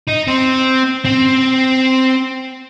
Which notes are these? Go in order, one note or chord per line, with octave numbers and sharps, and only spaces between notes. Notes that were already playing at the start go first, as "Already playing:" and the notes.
D#4
C4
C4